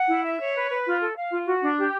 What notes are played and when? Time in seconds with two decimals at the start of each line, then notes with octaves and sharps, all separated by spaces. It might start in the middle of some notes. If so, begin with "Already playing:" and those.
Already playing: F#5
0.08 E4
0.24 E5
0.40 C#5
0.55 B4
0.70 B4
0.86 F4
1.02 A4
1.16 F5
1.31 F4
1.46 F#4
1.63 D4
1.78 G4